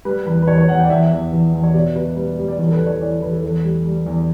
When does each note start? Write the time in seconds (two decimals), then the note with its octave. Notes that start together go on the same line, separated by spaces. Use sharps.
0.05 G3 B4
0.26 E2 B4
0.42 B4
0.48 E2 C#5
0.58 C#5
0.68 E2 F#5
0.79 G5
0.84 D5
0.90 E2 E5
1.11 E2
1.32 E2
1.53 E2
1.63 C#5
1.74 B2 D5
1.95 B2 B4
2.16 G3 B4
2.38 G3
2.48 D5
2.59 E2 C#5
2.68 A4
2.72 B4
2.80 E2
2.86 C#5
3.01 E3 D5
3.22 E2 B4
3.33 A4
3.43 E2 A4
3.64 G3
3.85 G3
4.07 E2